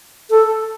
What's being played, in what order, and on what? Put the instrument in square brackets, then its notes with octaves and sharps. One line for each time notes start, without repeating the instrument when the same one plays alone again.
[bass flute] A4